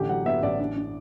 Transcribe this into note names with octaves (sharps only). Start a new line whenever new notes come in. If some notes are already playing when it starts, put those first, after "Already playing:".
Already playing: A1 D3 G4
F#3 F#5
B3 E5
A1 D5
D4
D4